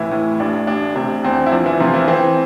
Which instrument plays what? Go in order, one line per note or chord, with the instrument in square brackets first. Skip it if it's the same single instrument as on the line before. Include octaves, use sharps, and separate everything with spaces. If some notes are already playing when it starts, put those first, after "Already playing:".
Already playing: [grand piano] F1 A2 E3 E4
A2
A1 D4
A1 D4
C3 D4
E2 C4
E4
F3 D4
E3 E4
C3 F3 F4
E3 E4
E3 C4